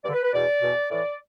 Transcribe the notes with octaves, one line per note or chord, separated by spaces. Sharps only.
G2 D3 D5
B4
B4
E2 B2 D5
E2 B2
A2 E3 D5